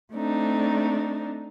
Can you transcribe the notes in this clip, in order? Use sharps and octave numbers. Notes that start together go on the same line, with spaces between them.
A3 C4 D4 D#4